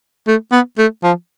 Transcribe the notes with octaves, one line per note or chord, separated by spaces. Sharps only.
A3
B3
A3
F3